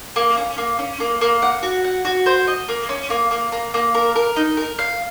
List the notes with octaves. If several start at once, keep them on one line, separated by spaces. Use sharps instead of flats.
A#3
C#4
A#3
C#4
A#3
A#3
F#5
F#4
F#5
F#4
C5
D#5
A#3
C#4
A#3
A#3
A#3
A#3
A#4
A#4
D#4
A#4
F5